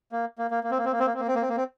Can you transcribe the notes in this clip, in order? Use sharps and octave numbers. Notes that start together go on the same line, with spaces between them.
A#3
A#3
A#3
A#3
C4
A#3
C4
A#3
C4
A#3
C4
A#3
C4
A#3
C4
A#3
C4